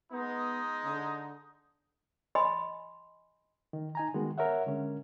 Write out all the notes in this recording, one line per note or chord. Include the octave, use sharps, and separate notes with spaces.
G#3 B3 D#4 D#6
D3
D#5 G#5 B5 C6
D#3
D#4 G#5 A#5
D#3 G#3 B3 F#4
A#4 C#5 E5 F#5
D3 G#3 C#4 A#4